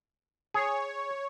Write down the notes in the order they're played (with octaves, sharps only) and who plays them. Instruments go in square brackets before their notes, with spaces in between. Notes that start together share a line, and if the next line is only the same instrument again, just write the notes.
[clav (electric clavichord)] G#4 [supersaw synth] C#5